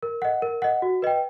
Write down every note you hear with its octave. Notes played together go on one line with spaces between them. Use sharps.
A#4
D#5 F#5
A#4
D#5 F#5
F#4
B4 D#5 G5